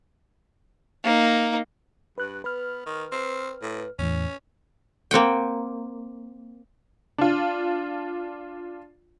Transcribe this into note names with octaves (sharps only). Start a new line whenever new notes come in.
A#3 D#4
G2 B4 F#6
B3 B4 F6
D#3
C4
A2
E2 A2 E3 C#4
A#3 C4 F#5 G5
D4 F4